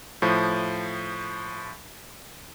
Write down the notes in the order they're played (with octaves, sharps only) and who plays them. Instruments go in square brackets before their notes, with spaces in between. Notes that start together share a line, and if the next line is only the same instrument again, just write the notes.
[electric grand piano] A2 F3